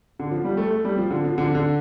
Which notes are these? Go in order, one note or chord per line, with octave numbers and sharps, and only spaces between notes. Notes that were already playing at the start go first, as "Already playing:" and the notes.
D3
F3
G3
A3
A3
G3
F3
D3
F3
D3
D3